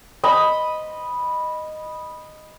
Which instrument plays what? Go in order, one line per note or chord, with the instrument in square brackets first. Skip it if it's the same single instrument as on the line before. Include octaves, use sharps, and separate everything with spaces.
[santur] D#5 B5